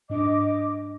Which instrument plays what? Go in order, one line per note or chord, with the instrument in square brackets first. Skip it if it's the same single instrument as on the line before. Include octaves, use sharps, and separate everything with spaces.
[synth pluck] G#2 D4 [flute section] D#5 D6